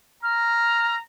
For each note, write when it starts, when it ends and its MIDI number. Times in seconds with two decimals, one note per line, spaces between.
0.23 0.99 82
0.23 0.95 89